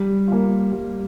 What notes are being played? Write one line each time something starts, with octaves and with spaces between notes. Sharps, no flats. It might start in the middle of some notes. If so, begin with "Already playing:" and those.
Already playing: G3
A#3 F4
G3